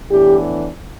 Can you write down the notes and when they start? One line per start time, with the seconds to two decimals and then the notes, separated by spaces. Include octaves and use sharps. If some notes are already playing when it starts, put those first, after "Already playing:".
0.11 A2 E3 B3 D4 G4